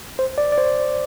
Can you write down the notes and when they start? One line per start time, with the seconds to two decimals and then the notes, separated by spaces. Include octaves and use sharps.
0.19 C5
0.38 D5
0.52 D5
0.58 C5